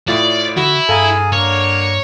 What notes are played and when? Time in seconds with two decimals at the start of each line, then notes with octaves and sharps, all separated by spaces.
0.08 A2 E4 F4 D5
0.57 D3 E4 F#4
0.89 G2 G#4 A4 F5 G#5 A#5
1.32 D3 A#3 A#4 C#5